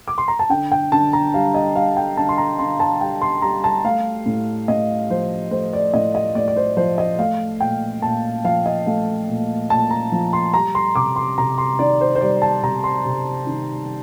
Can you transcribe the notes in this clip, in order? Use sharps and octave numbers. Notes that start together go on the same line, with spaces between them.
D6
C6
A#5
A5
D3 G5
G5
D3 A5
A#5
G3 F5
D#5
G3 F5
G5
D3 A5
C6
A#5
D3 C6
A5
G3 G5
C6
G3 A#5
A5
A3 F5
A2
A2 D#5
F3 C5
A3 C5
D5
A2 D#5
D#5
A2 D5
D5
C5
F3 C5
D#5
A3 F5
A#2 G5
A#2 A5
F3 F5
D#5
A3 F5
A#2
A#2 A5
A#5
F3
C6
G3 A#5
C6
C3 D6
C6
C3 A#5
C6
D#3 D5
C5
C5
G3 D5
A5
C3 A#5
C6
C3
D#3